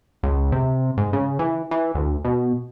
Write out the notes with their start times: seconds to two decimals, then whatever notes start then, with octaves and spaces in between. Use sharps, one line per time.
0.23 C#2
0.52 C3
0.97 G#2
1.13 C#3
1.39 E3
1.71 E3
1.95 D2
2.25 B2